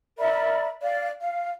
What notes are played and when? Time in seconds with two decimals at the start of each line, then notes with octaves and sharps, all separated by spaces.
0.18 A#4 D5 E5 B5
0.82 D5 F5
1.20 F5